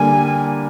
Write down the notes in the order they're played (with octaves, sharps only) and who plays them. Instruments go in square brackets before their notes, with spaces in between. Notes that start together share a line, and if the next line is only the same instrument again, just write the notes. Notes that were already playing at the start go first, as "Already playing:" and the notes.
Already playing: [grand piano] D3 G3 A#3 [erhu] G#5